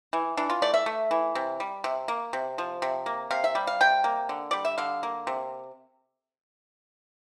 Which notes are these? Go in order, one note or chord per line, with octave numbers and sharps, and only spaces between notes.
E3
E3 D4
F4
A3 D5
E5
A3
E3
C3
G3
C3
A#3
C3
F3
C3
A#3
C3 F5
E5
G3
F5
C3 G5
A#3
D3
G3 D5
E5
D3 F5
A#3
C3